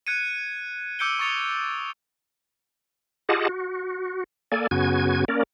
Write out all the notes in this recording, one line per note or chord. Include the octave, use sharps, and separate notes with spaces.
F#6 G#6 C#7 D#7
D6 E6 G6 C#7 D7 G7
C#6 D#6 A6 C#7 F7 G7
F4 G4 G#4 D#5 F#5 A5
F#4
A#3 A4 D5 G#5
F#2 C#3 B3 F#4 G#5 G#6
A#3 C#4 A#4 D5